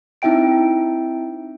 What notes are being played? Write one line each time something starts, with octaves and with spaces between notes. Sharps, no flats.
C4 D#4 E4 E5 G5 D7